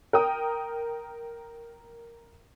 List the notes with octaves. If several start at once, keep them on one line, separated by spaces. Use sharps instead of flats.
A#4 G5 D#6